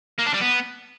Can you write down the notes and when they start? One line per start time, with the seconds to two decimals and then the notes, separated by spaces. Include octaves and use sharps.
0.18 A#3
0.26 D4
0.33 G3
0.41 B3